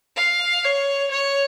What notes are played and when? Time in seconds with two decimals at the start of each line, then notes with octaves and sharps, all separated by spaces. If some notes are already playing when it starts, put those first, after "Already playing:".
0.17 F5
0.64 C#5
1.11 C#5